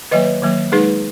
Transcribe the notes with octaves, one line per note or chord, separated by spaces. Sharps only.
D#3 F#3 A#3 B4 D#5
D#3 F#3 A#3
G#3 D#4 G#4 B4